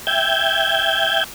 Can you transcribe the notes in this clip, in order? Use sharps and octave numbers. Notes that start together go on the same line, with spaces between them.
E5 G5 G6 G#6